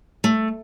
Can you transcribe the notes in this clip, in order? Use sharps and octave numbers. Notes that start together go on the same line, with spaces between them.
A3